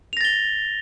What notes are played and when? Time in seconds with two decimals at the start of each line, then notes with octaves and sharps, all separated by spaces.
0.13 F7
0.17 A#6
0.21 A6
0.25 G7